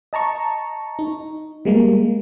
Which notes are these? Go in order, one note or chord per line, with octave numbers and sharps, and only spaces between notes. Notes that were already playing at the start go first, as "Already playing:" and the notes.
D#5 A5 A#5 C#6
D#4
G3 G#3 A#3